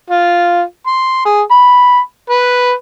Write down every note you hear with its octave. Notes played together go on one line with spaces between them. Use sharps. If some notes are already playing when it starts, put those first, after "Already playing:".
F4
C6
G#4
B5
B4